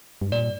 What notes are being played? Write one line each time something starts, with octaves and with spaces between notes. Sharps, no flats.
G2
A#2 D5